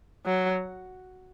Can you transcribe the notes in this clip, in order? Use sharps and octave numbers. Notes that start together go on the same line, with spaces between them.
F#3